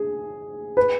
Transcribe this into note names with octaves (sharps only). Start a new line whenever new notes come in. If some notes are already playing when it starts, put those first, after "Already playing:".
Already playing: G#4
B4